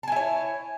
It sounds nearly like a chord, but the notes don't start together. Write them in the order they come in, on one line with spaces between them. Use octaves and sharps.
A5 G#5 E4 C#5